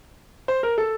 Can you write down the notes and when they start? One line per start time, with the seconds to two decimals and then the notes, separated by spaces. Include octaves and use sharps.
0.48 C5
0.63 A#4
0.78 A4